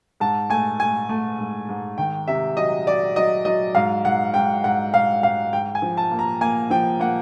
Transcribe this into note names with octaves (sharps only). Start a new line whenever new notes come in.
G#2 A5
A3 G#5
A3 G#5
A3
G#2
G#2
D#3 G5
C3 E5
F#3 D#5
F#3 D5
F#3 D#5
F#3 D#5
G#2 F5
G#2 F#5
G#2 G5
G#2 F#5
G#2 F5
G#2 F5
G#2 G5
G#5
F3
A5
A#3
A#5
A#3 G#5
F3 G5
A#3 F#5